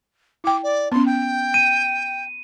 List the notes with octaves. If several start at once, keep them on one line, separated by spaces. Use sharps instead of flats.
E4 G5 D6
D5
B3 C#4 C6
G5
D#7